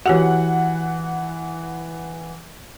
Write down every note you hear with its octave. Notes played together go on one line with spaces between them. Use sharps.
E3 F#4 G4 C#5 F#5